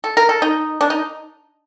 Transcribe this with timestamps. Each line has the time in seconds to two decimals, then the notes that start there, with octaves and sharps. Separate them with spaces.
0.04 A4
0.17 A#4
0.29 A4
0.42 D#4
0.81 D4
0.90 D#4